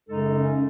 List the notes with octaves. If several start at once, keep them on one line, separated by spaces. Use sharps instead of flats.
F#2 C#3 G#3 D#4 A4
C#4